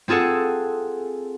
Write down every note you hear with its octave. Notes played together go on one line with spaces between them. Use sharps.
C4 F4 G#4 A4 F#5